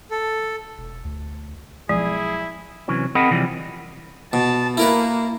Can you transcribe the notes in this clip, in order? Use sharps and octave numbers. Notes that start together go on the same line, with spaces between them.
A4
E1
D2
B1 F3 G#3 E4 G#4
C3 E3 F#3 C#4
C4 G#4 A#4 D#5 F#5 B5
C3 E3 F3 G3
B2 A5
A#3 E4 A#4 B4